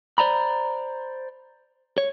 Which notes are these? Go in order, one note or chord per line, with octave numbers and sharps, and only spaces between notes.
C5 D5 A#5 B5
C#5